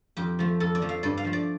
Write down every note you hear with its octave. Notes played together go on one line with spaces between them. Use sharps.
F2 G4
F3 A3
F2 A4
D5
F3 A3
F5
G2 D5
F5
F3 A3
D5